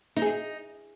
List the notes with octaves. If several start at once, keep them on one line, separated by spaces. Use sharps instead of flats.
D#4
G#4
D#4